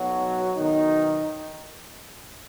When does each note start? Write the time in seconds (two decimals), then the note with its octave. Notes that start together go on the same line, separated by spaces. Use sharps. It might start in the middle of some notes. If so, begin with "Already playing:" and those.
Already playing: B1 B2 F#3 F#4
0.57 B1 B2 D#3 D#4